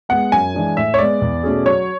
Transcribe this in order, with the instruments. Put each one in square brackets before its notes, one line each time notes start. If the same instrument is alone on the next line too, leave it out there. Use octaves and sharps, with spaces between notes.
[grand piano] G#3 B3 [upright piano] F#5
[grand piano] F#2 [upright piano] G#5
[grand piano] E3 G#3 D4
[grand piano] A2 [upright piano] E5
[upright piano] C#5
[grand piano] G#3 B3 [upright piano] D5
[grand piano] E2
B2 A3 C#4 G#4
[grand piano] F#3 [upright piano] C#5